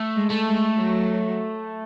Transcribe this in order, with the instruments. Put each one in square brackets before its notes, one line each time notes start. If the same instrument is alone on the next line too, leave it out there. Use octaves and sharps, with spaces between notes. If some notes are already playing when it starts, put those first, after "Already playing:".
Already playing: [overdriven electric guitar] A3
[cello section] G#3
[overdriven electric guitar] A3
[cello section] G#3
F#3